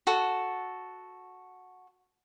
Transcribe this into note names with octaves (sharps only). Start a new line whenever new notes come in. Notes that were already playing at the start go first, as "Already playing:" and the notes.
F#4 A4